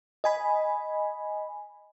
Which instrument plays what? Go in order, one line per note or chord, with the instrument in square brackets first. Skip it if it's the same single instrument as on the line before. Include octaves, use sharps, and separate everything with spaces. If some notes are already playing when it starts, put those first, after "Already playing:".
[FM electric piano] D#5 G#5 B5